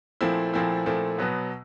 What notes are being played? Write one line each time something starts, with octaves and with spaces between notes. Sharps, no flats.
A#2 F3 A3 C4 E4
A#2 F3 A3 C4 E4
A#2 F3 A3 C4 E4
B2 F#3 B3